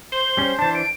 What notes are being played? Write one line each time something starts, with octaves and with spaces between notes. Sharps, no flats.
C5 G7
G3 C#4
E3 D4 A5
D7